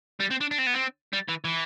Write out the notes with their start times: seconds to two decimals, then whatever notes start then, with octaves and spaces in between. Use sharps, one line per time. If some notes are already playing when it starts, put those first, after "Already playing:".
0.20 G3
0.30 C4
0.40 D4
0.51 D4
0.58 C4
0.67 B3
0.74 C4
1.13 G3
1.29 E3
1.45 E3